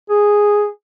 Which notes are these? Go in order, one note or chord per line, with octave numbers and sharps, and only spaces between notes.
G#4